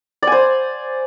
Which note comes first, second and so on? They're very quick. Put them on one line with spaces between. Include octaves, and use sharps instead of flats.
D5 G#5 C5